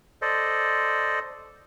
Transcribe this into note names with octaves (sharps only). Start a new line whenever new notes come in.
A4 C5 D5 D#5